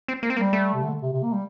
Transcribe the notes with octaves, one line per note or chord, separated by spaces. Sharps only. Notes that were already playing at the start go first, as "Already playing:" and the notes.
C4
A#3
C4
G3 A#3
A3
C3
D3
C3
C3
A#3
G3